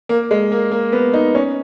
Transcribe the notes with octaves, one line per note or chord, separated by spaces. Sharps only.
A#3
G#3
A#3
A#3
B3
D#4
C#4